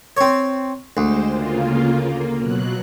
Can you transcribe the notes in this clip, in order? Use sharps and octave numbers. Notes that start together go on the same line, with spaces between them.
C4 C#5
D2 G#3 C5
C#3 A#3 F4
A#3
B2 F#3 F#6